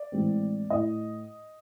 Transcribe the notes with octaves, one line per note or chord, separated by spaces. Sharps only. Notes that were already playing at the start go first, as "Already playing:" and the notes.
Already playing: D5
A2 E3 G#3 C4
A2 D#5